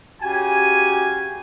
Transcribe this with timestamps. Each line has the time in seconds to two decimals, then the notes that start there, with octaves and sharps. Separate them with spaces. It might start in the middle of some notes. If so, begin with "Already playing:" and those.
0.22 C#3 F#4 G4 G#5